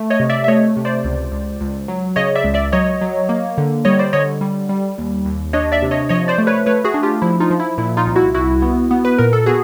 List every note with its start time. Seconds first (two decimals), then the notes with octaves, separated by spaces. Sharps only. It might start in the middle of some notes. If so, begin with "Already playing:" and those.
Already playing: A3
0.10 C#5 D#5
0.20 C3
0.29 D5 E5
0.44 E5
0.48 A3 C#5 D#5
0.77 C3
0.85 C5 D5
1.04 C#2
1.32 C#2
1.61 C#2
1.88 F#3
2.16 C#3 C#5 D#5
2.35 D5 E5
2.44 C#2
2.54 D5 E5
2.72 F#3 C#5 D#5
3.01 F#3
3.29 A#3
3.58 D3
3.85 G3 C#5 D#5
3.99 C5 D5
4.13 D3 C#5 D#5
4.41 G3
4.69 G3
4.98 D#2
5.25 D#2
5.53 D4 C#5 D#5
5.72 D5 E5
5.82 C3
5.91 C#5 D#5
6.09 F3 C#5 D#5
6.28 C5 D5
6.38 A3
6.47 B4 C#5
6.66 A3 B4 C#5
6.84 F#4 G#4
6.94 D4
7.03 F4 G4
7.22 F3 E4
7.40 D#4 F4
7.50 F3
7.60 E4
7.78 A#2 E4
7.97 D#4 F4
8.06 C2
8.16 E4 F#4
8.34 C2 E4 F#4
8.62 B3
8.91 B3
9.05 B4
9.18 A#2 A#4
9.33 A4
9.46 B3 F#4 G#4